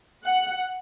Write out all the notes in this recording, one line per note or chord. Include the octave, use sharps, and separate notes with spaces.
F#5